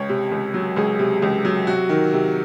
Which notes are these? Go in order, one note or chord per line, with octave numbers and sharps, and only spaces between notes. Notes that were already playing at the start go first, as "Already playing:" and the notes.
Already playing: C#2 C#5
C3
C#2
F#3
C#2 G#4
C3
C#2
F#3
C3 F#4
D#3
C3